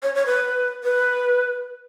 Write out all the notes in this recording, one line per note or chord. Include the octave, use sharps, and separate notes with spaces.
C#5
C#5
B4
B4